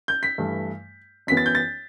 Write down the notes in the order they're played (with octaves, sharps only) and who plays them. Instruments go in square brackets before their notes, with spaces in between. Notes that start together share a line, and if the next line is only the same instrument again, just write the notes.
[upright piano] G6
B6
G2 E3 A3
F#2 E3 B3 B6
A6
G6
A6